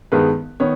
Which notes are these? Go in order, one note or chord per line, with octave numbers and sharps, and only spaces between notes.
G2 D#3 G#3 B3 B4
D#3 B3 C#5